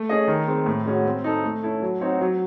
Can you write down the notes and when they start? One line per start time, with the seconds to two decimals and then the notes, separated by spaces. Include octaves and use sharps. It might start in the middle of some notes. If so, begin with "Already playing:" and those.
Already playing: A3
0.09 C#4 G#4 D#5
0.28 D#3
0.47 G#3 C4
0.66 A2
0.86 G#3 C#4 F#4
1.05 C4
1.24 D#4 A4
1.44 A3
1.63 C#4 E4 A4
1.82 F#3
2.01 C4 D#4 F#4 C#5
2.21 F#3